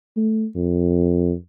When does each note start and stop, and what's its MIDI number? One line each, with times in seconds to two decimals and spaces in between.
0.17 0.46 57
0.56 1.33 41